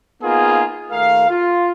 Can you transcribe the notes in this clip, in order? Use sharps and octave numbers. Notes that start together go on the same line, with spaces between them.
A#3 B3 D#4 F4 G#4
D#2 A3 A#4 F5
F4